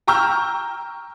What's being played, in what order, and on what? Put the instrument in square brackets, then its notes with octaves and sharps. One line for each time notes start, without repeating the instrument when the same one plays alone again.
[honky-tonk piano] G5 A#5 C#6 E6 F6 G6